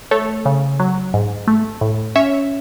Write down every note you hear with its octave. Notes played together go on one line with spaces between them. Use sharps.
A3 A4 C#5
C#3
F#3
G#2
A3
A2
C#4 C#5 E5